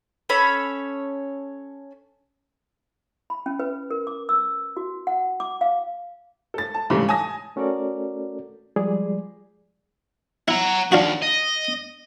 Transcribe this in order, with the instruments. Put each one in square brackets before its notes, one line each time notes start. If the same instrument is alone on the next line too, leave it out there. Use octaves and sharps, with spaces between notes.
[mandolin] C#4 A4 C#5 B5
[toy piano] B5
C#4
B4
A#4
D6
E6
F#4
F#5
D6
F5
[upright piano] A4 A6
A5
G#2 C#3 E3 G3 A3
G#5 A5 D#6 A#6
[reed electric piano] A3 C#4 F#4 A4 A#4 D5
F3 G3 G#3 G#4 D5
[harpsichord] E4 [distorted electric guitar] F#5 A#5
[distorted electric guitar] D#2 [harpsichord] D4 F4 F#4
[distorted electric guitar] D#5